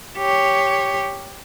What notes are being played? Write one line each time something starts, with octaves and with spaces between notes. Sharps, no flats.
G4 C#5